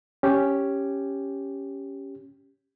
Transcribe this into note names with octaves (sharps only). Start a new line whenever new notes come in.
C#4 G4